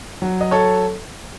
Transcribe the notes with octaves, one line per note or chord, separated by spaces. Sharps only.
F#3
D#5
A4 C#5